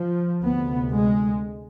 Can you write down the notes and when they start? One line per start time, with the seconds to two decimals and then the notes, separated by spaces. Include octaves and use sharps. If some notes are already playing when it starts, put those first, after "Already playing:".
Already playing: F3
0.44 D2 C3 B3
0.94 G#3